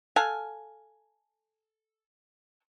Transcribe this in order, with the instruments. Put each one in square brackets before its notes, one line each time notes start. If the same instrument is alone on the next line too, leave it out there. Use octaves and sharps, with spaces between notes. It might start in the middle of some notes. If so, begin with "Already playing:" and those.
[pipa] A4 F5 F#5 G#5